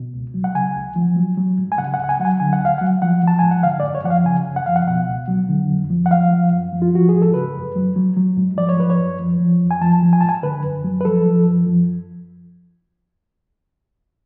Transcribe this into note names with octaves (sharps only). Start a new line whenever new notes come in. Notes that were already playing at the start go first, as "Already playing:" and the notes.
Already playing: B2
C#2
F#3
F#5
C#3 G#5
C#2
F3
F#3
F#3
G#2
G#5
C#3 F#5
F#5
C#2
F#5
G#5
F#3 F#5
G#5
D3 G#5
F#5
D2 F5
F#5
F#3
F3 F#5
F3 A5
G#2 G#5
F#5
D3 F5
D5
F#2
C#5
F3 F#5
F5
C#3 G#5
F#2
F#5
F3 F5
F#5
B2 F#5
C#2
F#3
D3
F2
F3
F#5
F3 F5
F3
F#2
F3
F4
F3 F#4
G#2 G#4
A4
C#3 B4
F#2
F#3
F#3
F#3
G#2
F3 D5
C#5
F3 B4
C#5
F#2
F3
F3
F2
G#5
F3 A5
F3
G#5
G#2 A5
G#5
D3 B4
F#2
F#3
B4
F3 A4
F3
F#2
F3